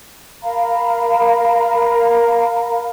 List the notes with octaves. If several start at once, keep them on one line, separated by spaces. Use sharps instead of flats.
A#4 F5 A#5 B5